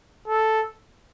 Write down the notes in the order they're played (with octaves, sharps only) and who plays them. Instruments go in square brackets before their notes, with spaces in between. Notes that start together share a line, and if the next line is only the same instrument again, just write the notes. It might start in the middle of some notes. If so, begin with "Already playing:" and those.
[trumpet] A4